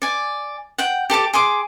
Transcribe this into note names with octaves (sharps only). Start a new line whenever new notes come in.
D5 G#5
F#5 G5
G4 A4 A5 D6
G#4 C6 D6